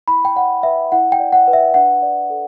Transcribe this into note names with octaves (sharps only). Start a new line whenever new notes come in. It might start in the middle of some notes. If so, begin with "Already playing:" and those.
E4 B5
G5
D5 F#5
B4 E5
E4 F#5
G5
D5
F#5
B4
E5
D4 F#5
D5
A4